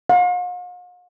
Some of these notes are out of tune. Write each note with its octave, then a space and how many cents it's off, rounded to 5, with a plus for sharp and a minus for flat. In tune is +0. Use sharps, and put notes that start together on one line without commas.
F5 +45